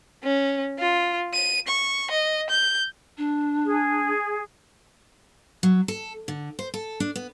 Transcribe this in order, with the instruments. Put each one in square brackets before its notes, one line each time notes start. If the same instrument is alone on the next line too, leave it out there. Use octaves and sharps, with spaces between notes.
[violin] C#4
F4
D#7
C#6
D#5
G6
[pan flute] D4
[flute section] G#4
[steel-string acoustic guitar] F#3
A4
D3
C5
A4
D4
B3